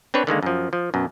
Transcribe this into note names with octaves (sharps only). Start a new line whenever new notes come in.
C4 D4 B4 C#5
D3 D#3 G#3 A#3
F#2 F3
F3
F#2 B2